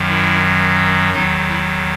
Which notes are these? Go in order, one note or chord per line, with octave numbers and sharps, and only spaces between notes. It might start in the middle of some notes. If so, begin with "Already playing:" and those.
Already playing: F#2 D#3 F#3
E4
E2 D#3 F#3 D#4
E4